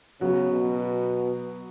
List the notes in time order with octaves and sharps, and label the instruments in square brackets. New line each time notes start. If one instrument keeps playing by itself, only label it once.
[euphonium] C#3 [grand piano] F#3 B3 F#4
[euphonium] B2